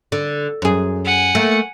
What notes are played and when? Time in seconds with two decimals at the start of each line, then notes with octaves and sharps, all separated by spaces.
0.12 D3
0.62 F#2 G#4
1.04 F#5 G#5
1.35 A3 A#3